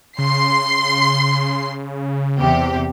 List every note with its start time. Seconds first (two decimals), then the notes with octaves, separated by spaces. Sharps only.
0.18 C#3 C6 C7
2.37 E2 C3 G4